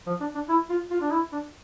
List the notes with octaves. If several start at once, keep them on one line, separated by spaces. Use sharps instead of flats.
F3
D4
D4
E4
F4
F4
D4
E4
D4